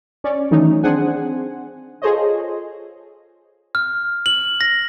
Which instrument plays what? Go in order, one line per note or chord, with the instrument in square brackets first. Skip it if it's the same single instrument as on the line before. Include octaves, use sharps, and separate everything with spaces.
[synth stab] C#4 C#5 D5
D#3 E3 F#3 A3 C#4 D#4
C4 D4 G#4 C5 F#5 G#5
F4 G#4 A4 C5 C#5 D#5
[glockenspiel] F6
F#7
A#6